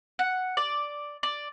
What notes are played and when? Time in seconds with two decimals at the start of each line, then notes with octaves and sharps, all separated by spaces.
0.19 F#5
0.57 D5
1.23 D5